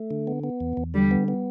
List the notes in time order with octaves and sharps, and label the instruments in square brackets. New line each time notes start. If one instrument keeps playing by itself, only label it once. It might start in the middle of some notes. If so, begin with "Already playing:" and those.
Already playing: [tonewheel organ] A3
D3
B3
B3
E2
E2
[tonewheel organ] D3 [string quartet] G3
[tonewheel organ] B3
B3